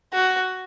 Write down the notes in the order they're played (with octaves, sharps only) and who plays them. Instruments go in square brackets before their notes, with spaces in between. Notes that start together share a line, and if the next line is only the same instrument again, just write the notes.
[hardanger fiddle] F#4